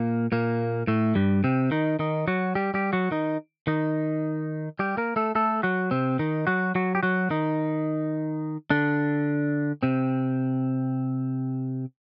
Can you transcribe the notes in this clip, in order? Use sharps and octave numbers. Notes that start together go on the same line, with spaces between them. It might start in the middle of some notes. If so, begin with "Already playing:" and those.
Already playing: A#2 A#3
A#2 A#3
A2 A3
G2 G3
C3 C4
D#3 D#4
D#3 D#4
F#3 F#4
G3 G4
G3 G4
F#3 F#4
D#3 D#4
D#3 D#4
G3 G4
A#3 A#4
A3 A4
A3 A4
F#3 F#4
C3 C4
D#3 D#4
F#3 F#4
F#3 F#4
G4
F#3 F#4
D#3 D#4
D3 D4
C3 C4